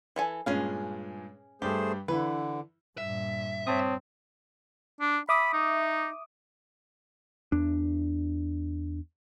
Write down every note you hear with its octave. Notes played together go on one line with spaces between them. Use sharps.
E3 A4 G#5
G2 A#2 G#3 C#4 G#4 F5
G2 G3 A3 G4 G#4 C5
D3 E3 E4 B4
G2 A#2 E5
G2 C4 C#5 A5 D#6
D4
E5 B5 D6 D#6
D#4
E2 D4